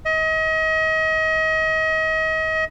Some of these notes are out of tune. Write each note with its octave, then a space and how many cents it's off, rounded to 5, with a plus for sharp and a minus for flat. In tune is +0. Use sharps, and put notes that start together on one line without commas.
D#5 +35